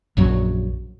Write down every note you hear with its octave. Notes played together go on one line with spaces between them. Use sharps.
A#1 F#2 F#3